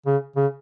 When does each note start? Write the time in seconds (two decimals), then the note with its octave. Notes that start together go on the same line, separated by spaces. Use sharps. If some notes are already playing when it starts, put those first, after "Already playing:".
0.06 C#3
0.36 C#3